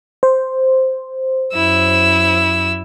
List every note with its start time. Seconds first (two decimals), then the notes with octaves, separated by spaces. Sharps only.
0.23 C5
1.54 F#2 E4 E6